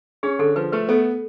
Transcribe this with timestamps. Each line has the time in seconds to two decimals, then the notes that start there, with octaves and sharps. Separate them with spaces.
0.23 C#4 G#4
0.39 D3 A4
0.56 F3 B4
0.72 A3 B4
0.89 B3 A4